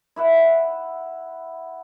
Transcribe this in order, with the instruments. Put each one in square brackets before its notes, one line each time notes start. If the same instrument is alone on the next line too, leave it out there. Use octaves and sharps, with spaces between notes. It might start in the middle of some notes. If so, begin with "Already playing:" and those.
[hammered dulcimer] E4 E5 F#5